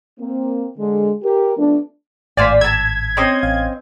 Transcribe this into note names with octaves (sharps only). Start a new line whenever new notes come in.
A#3 C4
D3 G#3
G4 A#4
F3 A3 B3 D4
G#1 A2 C5 D5 F5 G#5 B6
A5 E6 G#6
C4 C#4 D#5
A1 F5